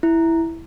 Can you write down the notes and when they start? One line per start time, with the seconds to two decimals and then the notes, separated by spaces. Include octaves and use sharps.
0.03 E4